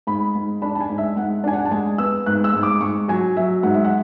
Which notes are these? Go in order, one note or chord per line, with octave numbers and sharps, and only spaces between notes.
G#2 B5
G#2
D4 B5
A5
G#5
G#2
E5
G#2 F#5
D4 G#5
F#5
A5
G#3 G#5
B3 E6
G#2 F#6
E6
G#2
D6
G#2 C#6
F#3 G#5
F#3 E5
G#2 F#5
E5
F#5